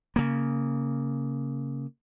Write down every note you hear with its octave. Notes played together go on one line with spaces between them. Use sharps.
C#3 A#3